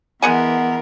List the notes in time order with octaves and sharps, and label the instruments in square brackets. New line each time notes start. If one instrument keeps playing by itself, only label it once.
[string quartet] E3 A#4 [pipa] G#3 F#5 G#5 [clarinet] B3